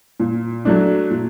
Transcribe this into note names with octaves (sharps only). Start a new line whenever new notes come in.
A#2
F#3 A3 D4
A#2